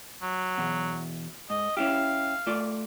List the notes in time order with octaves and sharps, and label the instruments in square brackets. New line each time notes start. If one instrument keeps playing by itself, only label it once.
[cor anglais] F#3
[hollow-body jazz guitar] E2 B2
[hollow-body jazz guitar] G#2 [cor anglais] D#5
[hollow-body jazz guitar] C#4 E4 G4 [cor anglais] F5
[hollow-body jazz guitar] A3 F4 D5